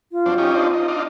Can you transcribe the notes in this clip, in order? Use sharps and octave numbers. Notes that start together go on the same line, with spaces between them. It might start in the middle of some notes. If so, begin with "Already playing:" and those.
F4
F#2 C4 D4
C#4 D#4 G4
C4 D4 D#4
D#4
D4 D#4 F4